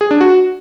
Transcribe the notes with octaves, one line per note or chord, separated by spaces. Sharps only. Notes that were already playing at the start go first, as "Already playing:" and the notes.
G#4
D4
F#4